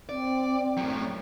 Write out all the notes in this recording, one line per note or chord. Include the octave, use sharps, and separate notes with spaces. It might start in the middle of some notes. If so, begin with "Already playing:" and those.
C4 D5
F#2 A2